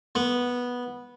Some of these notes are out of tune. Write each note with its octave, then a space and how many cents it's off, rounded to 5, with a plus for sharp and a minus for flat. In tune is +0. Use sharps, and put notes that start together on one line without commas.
B3 -10